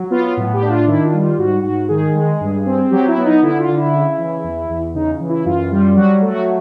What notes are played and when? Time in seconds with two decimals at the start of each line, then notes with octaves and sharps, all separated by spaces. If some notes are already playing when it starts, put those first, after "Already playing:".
Already playing: F#3
0.10 B3 F4
0.37 A2
0.53 G4
0.62 D4
0.70 F4
0.87 D#3 E4
1.04 F4
1.13 G3
1.22 F4
1.38 G#2 F#4
1.63 G#2 F#4
1.89 D#3 G#4
2.14 G#3
2.40 G2
2.66 C4
2.91 F#3 G4
3.08 E4
3.17 B3
3.24 D#4
3.42 D3 E4
3.59 F4
3.68 D3
3.76 E4
3.93 C#3
4.18 E3
4.44 E2
4.69 E2
4.94 C#3 D#4
5.20 E3
5.29 E4
5.45 F#2 F4
5.71 G3
5.97 F#3 F#4
6.21 A3
6.30 F#4